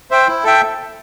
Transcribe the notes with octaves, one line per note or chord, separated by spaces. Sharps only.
C5 E5 G5
E4
A4 E5 G5